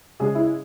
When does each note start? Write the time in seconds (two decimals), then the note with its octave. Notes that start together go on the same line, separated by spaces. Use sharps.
0.20 C#3 G#3 G#4
0.35 E4